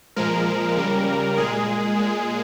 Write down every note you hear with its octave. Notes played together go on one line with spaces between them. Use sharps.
A#2 F3 G#3 A#4
C#3 G3
A#2 G#3 G#4
A#2 G#3